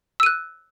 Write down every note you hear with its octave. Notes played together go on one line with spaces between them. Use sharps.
E6 F#6 D#7